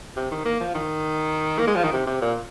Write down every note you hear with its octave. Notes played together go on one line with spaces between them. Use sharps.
C3
D#3
A#3
F3
D#3
A#3
G#3
F3
D#3
C3
C3
A#2